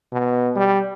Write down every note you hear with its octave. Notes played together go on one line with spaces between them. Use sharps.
B2
G3